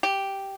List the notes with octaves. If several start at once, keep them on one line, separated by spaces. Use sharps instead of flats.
G4